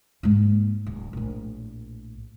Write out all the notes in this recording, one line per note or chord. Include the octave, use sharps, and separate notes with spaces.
G#2 A#3
D1
A#1 A2